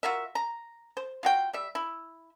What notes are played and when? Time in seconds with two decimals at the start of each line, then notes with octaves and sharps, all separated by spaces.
0.03 F4 F#4 A#4 E5
0.35 A#5
0.97 C5
1.23 F4 F#4 G5
1.53 G3 E5
1.75 E4